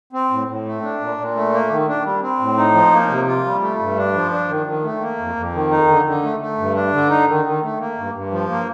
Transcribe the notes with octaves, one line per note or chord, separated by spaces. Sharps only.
C4
A2
A2
A3
D4
A#2
A#2
A3
A#3
D#3
D4
G3
C4
A2
D#4
F3
A#3
C3
F4
G3
A3
G2
D4
F3
D4
D#3
D#3
A3
A#3
F2
F2
D#3
D#4
D3
D3
A3
A3
G2
D4
D3
D#4
D#3
D#3
A3
A#3
G2
G2
F3
A#3